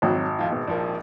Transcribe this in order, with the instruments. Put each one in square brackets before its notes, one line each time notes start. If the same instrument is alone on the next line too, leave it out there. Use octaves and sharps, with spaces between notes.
[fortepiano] G#1 [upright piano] F2 F#3
[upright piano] A2 F3 F4
G#2 B2
A#1 F3 A#3